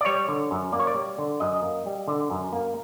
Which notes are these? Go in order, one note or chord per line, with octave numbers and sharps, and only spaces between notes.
D5
G3 C#5
D3
F#2
A#3 D5
C#5
D5
G3
D3
F#2 D#5
A#3
G3
D3
F#2
A#3